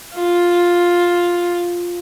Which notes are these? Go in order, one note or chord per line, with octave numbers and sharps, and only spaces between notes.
F4